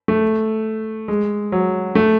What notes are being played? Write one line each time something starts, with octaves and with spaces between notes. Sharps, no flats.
A3
G#3
F#3
A3